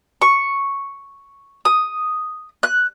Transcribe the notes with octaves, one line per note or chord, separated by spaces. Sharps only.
C#6
D#6
F#6